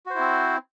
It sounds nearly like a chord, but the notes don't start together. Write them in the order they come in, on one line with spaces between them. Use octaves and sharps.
F#4 C5 E4 C4